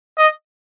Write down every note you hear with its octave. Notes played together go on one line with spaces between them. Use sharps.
D#5